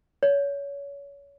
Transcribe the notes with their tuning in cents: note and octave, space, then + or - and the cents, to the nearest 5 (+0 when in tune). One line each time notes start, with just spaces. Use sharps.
C#5 +25